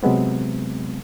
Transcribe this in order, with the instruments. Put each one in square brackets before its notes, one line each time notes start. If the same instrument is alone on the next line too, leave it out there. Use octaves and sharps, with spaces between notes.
[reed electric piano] C3 F#3 G#3 B3 C4